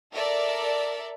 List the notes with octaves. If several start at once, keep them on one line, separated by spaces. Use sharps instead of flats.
A4 A#4 D5 E5